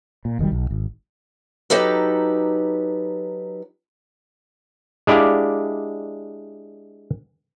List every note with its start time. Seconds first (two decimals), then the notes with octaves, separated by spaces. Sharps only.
0.25 A#2
0.39 F1 D#3 F#3 G3
0.52 B1
0.71 G#1
1.70 F#3 D#4 G4 A4 B4
5.07 G#3 D4 E4 G4 D5 F5